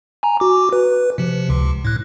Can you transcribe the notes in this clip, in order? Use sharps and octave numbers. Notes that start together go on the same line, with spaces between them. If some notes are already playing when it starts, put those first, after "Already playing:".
G#5 A#5
F#4 D6
B4
C3 F3
C#2
A2 F#6